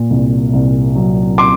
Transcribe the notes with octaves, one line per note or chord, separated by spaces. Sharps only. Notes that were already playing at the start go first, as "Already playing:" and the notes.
Already playing: A#2
C2
C2
F#3
C6 D6